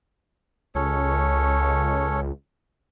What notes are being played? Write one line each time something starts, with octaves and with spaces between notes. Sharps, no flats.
C#2 C#4 A4 C#5